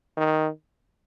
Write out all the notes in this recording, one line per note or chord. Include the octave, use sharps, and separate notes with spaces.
D#3